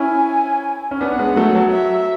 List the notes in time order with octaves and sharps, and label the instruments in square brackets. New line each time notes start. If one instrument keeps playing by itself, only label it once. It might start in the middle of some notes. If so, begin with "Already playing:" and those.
Already playing: [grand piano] C#4 E4 [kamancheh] G#5
[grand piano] C#4
[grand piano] B3 D4 [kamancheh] F#5
[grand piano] G#3 B3
F#3 A3
F#3
[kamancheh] E5